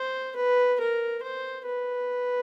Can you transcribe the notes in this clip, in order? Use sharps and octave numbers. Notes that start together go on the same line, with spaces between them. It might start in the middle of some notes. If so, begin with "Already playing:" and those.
Already playing: C5
B4
A#4
C5
B4